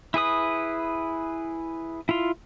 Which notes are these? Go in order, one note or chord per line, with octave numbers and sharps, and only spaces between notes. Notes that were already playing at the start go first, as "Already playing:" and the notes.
E4 G#4 B4 D#6
E4 F4